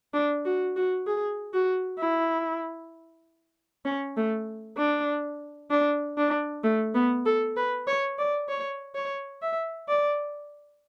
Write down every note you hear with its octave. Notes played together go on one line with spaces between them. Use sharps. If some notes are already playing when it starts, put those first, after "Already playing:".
D4
F#4
F#4
G#4
F#4
E4
C#4
A3
D4
D4
D4
A3
B3
A4
B4
C#5
D5
C#5
C#5
E5
D5